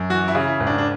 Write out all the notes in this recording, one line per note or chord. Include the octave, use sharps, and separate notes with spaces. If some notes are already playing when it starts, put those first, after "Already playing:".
Already playing: F#2
E3 F#4
E4
C#3
E4
G#1
D4
D4